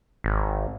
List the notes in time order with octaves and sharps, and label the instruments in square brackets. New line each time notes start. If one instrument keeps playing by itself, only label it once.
[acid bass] G#1